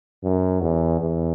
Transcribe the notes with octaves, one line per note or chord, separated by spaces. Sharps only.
F#2
E2
E2